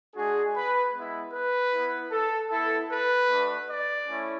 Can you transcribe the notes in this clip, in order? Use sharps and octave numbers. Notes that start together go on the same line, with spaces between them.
G#3 D4 F#4 G#4
B4
G#3 B3 E4
B4
B3 E4
A4
B3 E4 A4
B4
A3 D4 F#4
D5
A3 C#4 E4